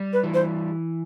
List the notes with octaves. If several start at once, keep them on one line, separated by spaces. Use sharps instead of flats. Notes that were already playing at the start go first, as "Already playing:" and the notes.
Already playing: G3
B4
E3
C5